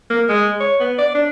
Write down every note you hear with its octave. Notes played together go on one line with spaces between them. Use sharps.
A#3
G#3
C#5
B3
D5
D4